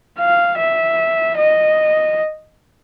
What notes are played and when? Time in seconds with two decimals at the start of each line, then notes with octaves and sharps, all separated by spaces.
0.19 F5
0.58 E5
1.37 D#5